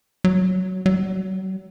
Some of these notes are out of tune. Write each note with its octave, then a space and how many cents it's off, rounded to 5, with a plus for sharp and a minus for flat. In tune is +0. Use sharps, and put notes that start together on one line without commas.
F#3 +10
F#3 +40